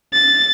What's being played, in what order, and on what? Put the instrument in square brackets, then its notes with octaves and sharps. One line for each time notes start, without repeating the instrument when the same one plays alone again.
[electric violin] A6